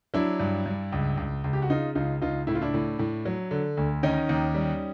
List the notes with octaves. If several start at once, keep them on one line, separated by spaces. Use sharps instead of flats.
F#3 D4 E4
G2
G2
C#2
C#2
C#2
G4
F#4
C#3 D#4 F4
C#2 D#4 F4
C#2 D#4 F4
A2 E4
F4
D4 E4
A2
A2
F#3
D3
D2
D#3 C#4 D#4
D#2
G3